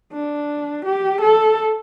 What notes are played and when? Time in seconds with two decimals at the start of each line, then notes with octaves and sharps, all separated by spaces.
0.13 D4
0.85 G4
1.21 A4